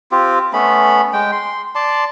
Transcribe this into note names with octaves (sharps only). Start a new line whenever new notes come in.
C4 F4 G4
A3 B3 C#4 B5
G#3 G5
C6
D5 A5 C6